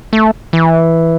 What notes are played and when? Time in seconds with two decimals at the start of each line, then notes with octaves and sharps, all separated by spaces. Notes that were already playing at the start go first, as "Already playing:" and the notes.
0.13 A3
0.53 E3